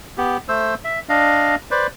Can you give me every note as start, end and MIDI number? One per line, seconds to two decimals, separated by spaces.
0.18 0.37 59
0.18 0.37 67
0.49 0.74 57
0.49 0.74 72
0.49 0.74 88
0.85 0.99 76
1.09 1.55 62
1.09 1.55 75
1.09 1.55 77
1.71 1.87 71
1.71 1.87 72
1.71 1.87 74